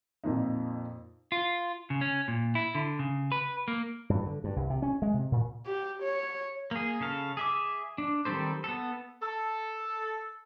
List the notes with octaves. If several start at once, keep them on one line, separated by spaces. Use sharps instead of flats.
F2 A#2 D#4
F4
C#3
C#4
A#2
E4
D3
C#3
B4
A#3
G2
D3
G2
C2
C3
C#4
G#3
C3
A#2
G4
C#5
A#3 G#4
C#3 A4 F5
G#4 E5 D6
D4
D#3 G3 C4 A4 C5
B3 A4
A4